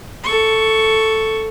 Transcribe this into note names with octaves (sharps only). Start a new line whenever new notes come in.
A4 C#6